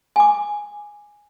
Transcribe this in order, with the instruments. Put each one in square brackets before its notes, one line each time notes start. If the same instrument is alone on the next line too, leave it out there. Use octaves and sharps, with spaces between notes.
[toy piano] G#5 D6